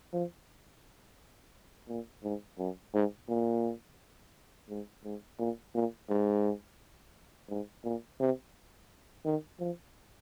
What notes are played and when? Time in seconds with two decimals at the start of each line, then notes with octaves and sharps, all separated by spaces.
0.13 F3
1.88 A#2
2.24 G#2
2.58 F#2
2.94 G#2
3.29 A#2
4.69 G#2
5.04 G#2
5.39 A#2
5.74 A#2
6.09 G#2
7.50 G#2
7.84 A#2
8.20 C3
9.25 D#3
9.60 F3